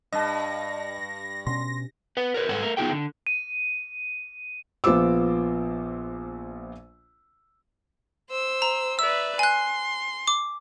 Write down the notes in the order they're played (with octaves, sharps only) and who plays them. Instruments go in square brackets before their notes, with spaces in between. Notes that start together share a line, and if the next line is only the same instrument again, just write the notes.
[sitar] G2 [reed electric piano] D#5 A5 [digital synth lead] A#6
[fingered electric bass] B2 C#4 [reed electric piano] C6 [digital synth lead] A#6
[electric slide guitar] B4 F#5
A#4 B4 C#5
G#2 A4 B4 F#5
A3 A#4
B3 D#4 F4 G#4 G5
D3
[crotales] D#7
[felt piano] A#1 B3 F4 C5 D6 E6
[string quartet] C5 E6
[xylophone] A#5
[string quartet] B4 D5 E5 [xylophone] E6
[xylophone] G#5 F#6 [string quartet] C6
[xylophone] D6